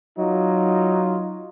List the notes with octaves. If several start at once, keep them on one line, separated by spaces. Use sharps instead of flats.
F#3 D#4 F4